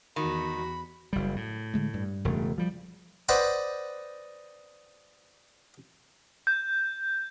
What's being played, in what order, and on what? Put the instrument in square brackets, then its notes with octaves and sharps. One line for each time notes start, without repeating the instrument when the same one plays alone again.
[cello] E2 F#4 [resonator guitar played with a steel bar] D#3 [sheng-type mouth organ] B5
[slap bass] F#1 G3
A2
[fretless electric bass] D3 G#3 A3
G2
[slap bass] E1 C#3 A3
F3 G3
[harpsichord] B4 C5 D5 D#5 F#5 G5
[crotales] G6